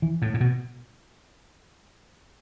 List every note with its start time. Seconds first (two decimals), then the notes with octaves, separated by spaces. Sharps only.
0.02 E3
0.22 A2
0.34 A2
0.40 B2